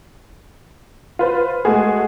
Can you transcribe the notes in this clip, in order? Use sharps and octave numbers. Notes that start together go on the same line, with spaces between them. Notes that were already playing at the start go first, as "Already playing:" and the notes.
F4 B4 C5
G#3 A3 F#4 G#4